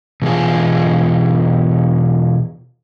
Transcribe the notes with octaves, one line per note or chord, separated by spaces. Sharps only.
B2 E3 F4 G#4